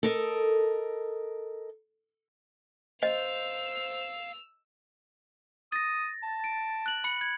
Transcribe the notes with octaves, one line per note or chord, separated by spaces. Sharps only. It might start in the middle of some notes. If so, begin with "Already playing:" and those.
A4 A#4 D#5
C5 D#5 F5 E6 F7
D#6 A6 A#6
A5
D7
F#6 F#7
B5 C#7
G#6